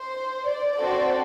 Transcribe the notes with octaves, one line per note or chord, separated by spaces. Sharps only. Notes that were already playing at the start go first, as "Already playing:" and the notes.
Already playing: C5
D5
C4 F#4 A4